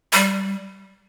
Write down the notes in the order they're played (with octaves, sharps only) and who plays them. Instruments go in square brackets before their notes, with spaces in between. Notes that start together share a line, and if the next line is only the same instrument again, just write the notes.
[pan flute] G3